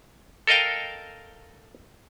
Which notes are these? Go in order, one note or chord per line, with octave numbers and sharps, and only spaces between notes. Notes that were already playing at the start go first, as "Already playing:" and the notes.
A4 A#4 D#5 F5 G5